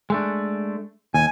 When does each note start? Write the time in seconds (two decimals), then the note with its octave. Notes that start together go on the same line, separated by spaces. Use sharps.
0.10 G#3 A3 D4
1.14 D#2 G#5